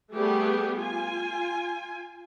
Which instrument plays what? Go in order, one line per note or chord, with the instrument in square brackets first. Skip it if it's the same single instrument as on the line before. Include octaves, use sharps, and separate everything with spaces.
[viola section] G3 A3 B3 G4 G#4
F4 G#5